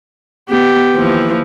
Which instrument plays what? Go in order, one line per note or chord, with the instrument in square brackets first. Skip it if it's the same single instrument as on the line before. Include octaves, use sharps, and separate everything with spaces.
[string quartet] B3 [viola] G4
[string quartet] D#2 E3 F3